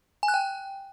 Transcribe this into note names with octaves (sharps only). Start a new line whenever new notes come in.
G#5
F#6
G5